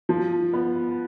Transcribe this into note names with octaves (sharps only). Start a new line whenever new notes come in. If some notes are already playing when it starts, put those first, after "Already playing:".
F3
B3